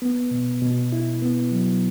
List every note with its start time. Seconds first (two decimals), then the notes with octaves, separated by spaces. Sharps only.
0.02 B3
0.31 B2
0.62 B2
0.92 E4
1.22 B3
1.52 F#3